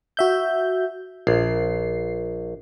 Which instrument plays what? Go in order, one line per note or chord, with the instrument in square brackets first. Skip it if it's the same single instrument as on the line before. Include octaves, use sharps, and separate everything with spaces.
[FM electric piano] F#4 E5 G6
[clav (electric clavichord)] A#1 [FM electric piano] C7